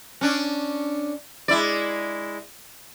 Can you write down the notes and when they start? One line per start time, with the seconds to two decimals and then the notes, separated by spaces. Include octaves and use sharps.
0.21 C#4 D4
1.48 G#3 E4 D5